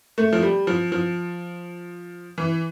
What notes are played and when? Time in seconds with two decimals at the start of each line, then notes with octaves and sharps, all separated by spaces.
0.18 A3
0.33 F3
0.42 G3
0.67 F3
0.92 F3
2.38 E3